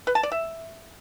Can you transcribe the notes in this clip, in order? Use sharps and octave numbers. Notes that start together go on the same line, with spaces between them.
B4
A5
D5
E5